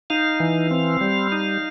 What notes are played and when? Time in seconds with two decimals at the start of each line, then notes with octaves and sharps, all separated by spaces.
0.10 D#4 F5
0.40 E3
0.71 C4
1.01 G3
1.32 D#4